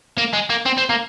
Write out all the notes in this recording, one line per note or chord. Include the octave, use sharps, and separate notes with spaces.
A#3
G#3
A#3
C4
C4
A#3